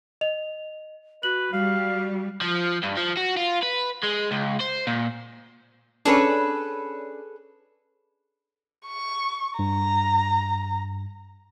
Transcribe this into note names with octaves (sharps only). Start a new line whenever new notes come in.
D#5 F7
F#4 B4 F#7
G3 F#4 F5
F3
G2
F3
F#4
F4
B4
G#3
C#2
C5
A#2
C#4 D4 G#4 A4 B4
C#6
G2 A#5